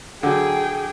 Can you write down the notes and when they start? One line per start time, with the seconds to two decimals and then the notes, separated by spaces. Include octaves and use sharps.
0.23 D3 F#3 G#4 G5